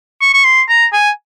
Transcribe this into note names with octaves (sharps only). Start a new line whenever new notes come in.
C#6
C#6
C6
A#5
G#5